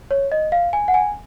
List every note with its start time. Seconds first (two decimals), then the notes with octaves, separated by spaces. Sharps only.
0.11 C#5
0.32 D#5
0.52 F5
0.73 G#5
0.88 F#5
0.94 G#5